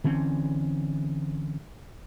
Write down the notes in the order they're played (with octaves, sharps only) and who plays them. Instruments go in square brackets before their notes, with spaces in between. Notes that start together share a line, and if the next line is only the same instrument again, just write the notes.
[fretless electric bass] D3 E3 C4 C#4